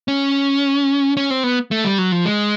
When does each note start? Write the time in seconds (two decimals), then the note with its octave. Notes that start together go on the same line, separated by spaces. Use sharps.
0.08 C#4
1.17 C#4
1.31 C4
1.44 B3
1.71 A3
1.84 G3
1.98 F#3
2.12 F3
2.26 G#3